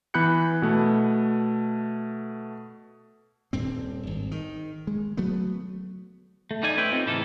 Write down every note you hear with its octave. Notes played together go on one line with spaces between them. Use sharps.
E3 B3 B5 F#6 G6 C#7
B2 A3
D#1 G2 C4
G#1
D#3
G#3
F#3 A3 B3
A3
G3 D#4 D5 G#5
A3 C#4 B4 C5 E5 G5
C4 D#4 F4
A2 C#3 E3 A#3 A4